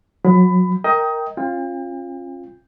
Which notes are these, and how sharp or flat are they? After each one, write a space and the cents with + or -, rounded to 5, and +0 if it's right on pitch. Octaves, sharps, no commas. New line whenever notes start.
F#3 -25 B5 +20
A#4 +0 D#5 +20 G5 +0
C#4 -45 F4 +0 G5 +40